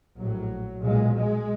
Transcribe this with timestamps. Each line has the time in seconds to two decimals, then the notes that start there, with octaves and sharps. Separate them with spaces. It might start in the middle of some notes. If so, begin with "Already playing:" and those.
0.18 A#1 A2 F#3
0.83 B1 A#2 G#3
1.16 G#3